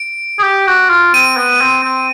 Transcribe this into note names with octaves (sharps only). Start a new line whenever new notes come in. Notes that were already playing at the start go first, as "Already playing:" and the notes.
Already playing: D7
G#4
G4
F#4
F4
C4 D#7
B3
C4
C4